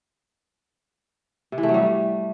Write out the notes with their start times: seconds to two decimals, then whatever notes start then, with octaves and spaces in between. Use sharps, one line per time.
1.52 C3
1.58 E3
1.63 A3
1.69 F#3
1.74 G3